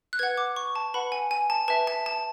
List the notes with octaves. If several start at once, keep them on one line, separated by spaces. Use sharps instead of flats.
F#6
B4 F#5 G#6
D6
C#6
A5
B4 F#5 B5
G#5
G#5
A5
B4 E5 A5
A5
A5